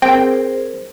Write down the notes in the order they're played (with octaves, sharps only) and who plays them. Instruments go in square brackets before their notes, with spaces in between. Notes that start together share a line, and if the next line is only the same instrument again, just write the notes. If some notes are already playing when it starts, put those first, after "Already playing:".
[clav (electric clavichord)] C4 [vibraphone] G#4 A#4 C5 [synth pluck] G5